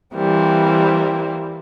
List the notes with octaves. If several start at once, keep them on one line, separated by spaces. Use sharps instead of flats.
E3 G3 A#3 C4